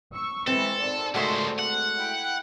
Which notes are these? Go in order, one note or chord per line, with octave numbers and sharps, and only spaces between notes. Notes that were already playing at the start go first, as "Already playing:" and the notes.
C#6 E6
E3 G#3 C4 A4
G#1 D5
C#2 G#3 A3 F#4 C5
F#5
E4 G5